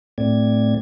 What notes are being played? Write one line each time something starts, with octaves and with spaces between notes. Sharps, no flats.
A2 A3 C4 D5 G#6